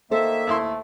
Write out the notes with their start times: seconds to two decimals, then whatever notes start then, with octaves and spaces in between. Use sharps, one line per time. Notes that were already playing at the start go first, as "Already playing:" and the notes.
0.11 D#3 A#3 A4 C5 E5
0.47 D#2 A3 E4 C6